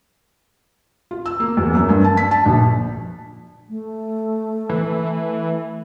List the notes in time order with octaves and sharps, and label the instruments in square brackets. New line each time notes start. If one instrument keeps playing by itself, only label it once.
[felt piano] F4
E6
A#3
E2
F#2
G2
A5
B6
A5
A#1
[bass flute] A3
[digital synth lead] E3